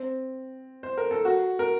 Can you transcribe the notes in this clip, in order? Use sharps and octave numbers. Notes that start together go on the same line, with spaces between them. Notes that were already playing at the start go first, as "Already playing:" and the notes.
Already playing: C4
C5
A#4
A4
F#4
A#4